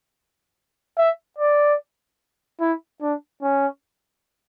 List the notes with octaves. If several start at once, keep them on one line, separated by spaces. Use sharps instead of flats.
E5
D5
E4
D4
C#4